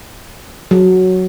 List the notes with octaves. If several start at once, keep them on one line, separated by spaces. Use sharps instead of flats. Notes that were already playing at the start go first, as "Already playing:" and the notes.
F#3